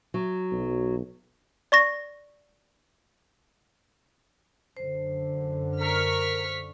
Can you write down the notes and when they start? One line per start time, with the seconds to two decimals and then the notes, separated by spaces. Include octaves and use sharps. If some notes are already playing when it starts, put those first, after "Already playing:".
0.14 F#3
0.51 B1
1.72 D5 C#6 A#6
4.77 F#2 D3 C5
5.80 A#4 C#6 F6 B6